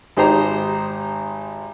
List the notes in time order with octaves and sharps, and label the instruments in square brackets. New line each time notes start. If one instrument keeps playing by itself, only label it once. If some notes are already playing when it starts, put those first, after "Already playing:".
[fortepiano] G#1 D#4 G4 C5 A#5